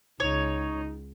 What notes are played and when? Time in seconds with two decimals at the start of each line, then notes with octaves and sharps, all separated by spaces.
0.20 C#2 D#4 C#5